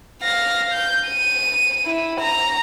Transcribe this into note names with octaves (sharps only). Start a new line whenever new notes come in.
F5 A#6
G6
D#7
E4
A#5